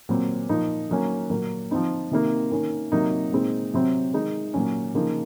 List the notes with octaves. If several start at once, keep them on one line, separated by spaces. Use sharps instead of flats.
A#2 F#3 C4
A#2 F3 A#3 D#4
D#3 F#3 A#3 C#4
A#2 F#3 A#3
F3 C4 D#4
C3 D#3 A#3
D#3 A#3 C#4
C3 F#3 A#3 D#4
A#2 G#3 C4 D#4
C3 F#3 C4
D#3 G#3 D#4
A#2 F#3 C#4
C#3 F3 A#3 D#4